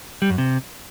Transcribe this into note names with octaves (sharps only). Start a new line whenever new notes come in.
G3
F#2
C3